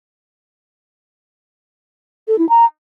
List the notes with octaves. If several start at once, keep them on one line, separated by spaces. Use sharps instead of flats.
A4
E4
A#5